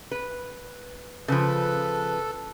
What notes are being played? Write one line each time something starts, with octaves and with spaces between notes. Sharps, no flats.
B4
C#3 F3 A4 B4